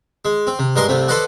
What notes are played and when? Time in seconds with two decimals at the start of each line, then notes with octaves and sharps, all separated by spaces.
0.25 G#3
0.47 C4
0.59 C3
0.76 G2 G#3 A#4 D#5 C6 D#6
0.89 C2 C3 A3
1.08 A4 B4 C5 D5 D#5 F#5